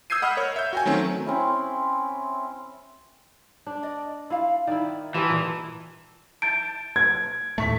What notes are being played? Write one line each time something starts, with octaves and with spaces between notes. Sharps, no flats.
D#6 E6 G6 G#6 C7 D#7
D#5 F#5 B5 E6 F6
A#4 C#5
E5 G6
F#4 G5 G#5
D#3 F#3 A3 C4 C#4
C4 C#4 E4
D4
D5 D#5
E4 F4 F5
D#3 E4 D5
E3 F4 G4 A4 D#5 G5
A#2
A5 G6 A6 D7
G#6
D#1 A2 A3 A5 C#6 B6